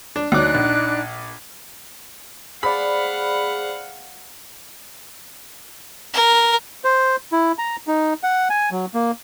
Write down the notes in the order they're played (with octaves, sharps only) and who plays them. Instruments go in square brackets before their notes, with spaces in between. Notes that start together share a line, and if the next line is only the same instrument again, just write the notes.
[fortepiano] D4
[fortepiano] D2 F#3 D6 [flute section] D4 D#4 F#6
[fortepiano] A#1
[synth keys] G#4 C5 D5 [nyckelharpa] F5 F#5 [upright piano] B5
[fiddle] A#4
[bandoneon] C5
E4
A#5
D#4
F#5
G#5
F#3
A#3